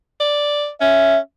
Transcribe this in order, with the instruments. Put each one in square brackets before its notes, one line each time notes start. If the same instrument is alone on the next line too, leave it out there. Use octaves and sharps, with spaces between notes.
[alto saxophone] D5
[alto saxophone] C#4 [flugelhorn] E5